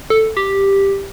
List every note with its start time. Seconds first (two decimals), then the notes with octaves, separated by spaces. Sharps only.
0.10 A4
0.37 G4